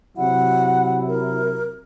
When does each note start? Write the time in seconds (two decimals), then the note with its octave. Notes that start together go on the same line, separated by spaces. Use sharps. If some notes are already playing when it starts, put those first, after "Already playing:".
0.17 C3 F#3 E4 F#5
1.08 A#4